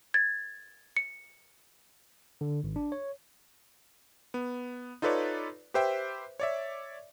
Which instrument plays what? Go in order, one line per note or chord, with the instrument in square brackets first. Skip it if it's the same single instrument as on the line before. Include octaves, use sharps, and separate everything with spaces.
[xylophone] G#6 A6
C#7
[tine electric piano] D3
G#1
D4
C#5
[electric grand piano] B3
D#4 F4 A4 B4 C#5 D5
G4 B4 C5 E5 G5
C#5 D5 E5